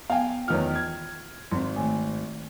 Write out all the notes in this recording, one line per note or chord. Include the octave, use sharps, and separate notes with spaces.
B3 F5 G5 G#5
E2 D#3 F4 B4 C#5 F6
G#6
G#1 C4 C6
D#3 A3 G#5